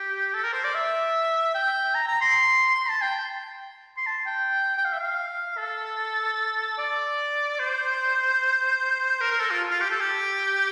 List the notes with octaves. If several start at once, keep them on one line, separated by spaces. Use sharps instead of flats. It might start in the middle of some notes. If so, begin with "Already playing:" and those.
Already playing: G4
A4
A#4
C5
D5
E5
G5
A#5
A#5
C6
C6
A5
G5
C6
A5
G5
G5
F5
E5
F5
A4
D5
C5
A#4
A#4
A4
F4
F4
G4
A4
G4